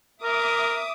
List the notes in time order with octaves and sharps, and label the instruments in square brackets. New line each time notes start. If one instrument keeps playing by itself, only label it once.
[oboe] A#4 [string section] E5 D6 D#6